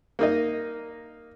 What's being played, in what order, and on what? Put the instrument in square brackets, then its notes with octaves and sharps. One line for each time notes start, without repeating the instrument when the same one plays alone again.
[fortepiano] A#3 D#4 D#5